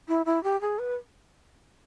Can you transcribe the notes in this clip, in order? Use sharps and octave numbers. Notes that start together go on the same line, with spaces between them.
E4
E4
G4
G#4
B4